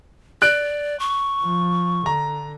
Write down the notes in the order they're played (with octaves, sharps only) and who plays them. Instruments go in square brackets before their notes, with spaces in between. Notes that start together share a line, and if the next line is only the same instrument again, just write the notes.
[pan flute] D5 [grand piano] F#6 D7
[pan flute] C#6
[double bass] F3
[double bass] D3 [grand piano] A#5